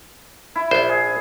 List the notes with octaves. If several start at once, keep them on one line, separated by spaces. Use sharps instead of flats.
E4
A#1 C5
G#4